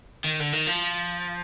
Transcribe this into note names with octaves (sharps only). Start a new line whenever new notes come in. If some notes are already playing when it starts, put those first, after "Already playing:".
D#3
D3
D#3
F3